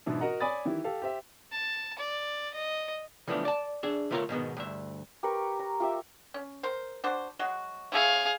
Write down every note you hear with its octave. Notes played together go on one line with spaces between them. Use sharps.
G#2 B2 E3 D4 E4
F#4 A#4 D#5 F#5 A#5
C#5 D5 G#5 B5 D#6 A6
D#3 E3 E4 G4
G4 A4 F5
G4 C5 E5
A5
D5
D#5
C#3 E3 F3 A3 B3 D4
D5 A5
D4 G#4 E5
D3 A3 F4 A#4 C#5 F5
G#2 B2 D#3 B3
D2 G2 E5
G4 A#4 B4 C#6
A#5
F4 G4 E5
C#4
A#4 C5
D4 F#4 C5
F#3 G#3 F#4
E4 G#4 C#5 E5 F5